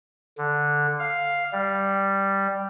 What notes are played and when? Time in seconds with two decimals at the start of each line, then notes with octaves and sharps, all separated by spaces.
0.38 D3
0.99 F5
1.53 G3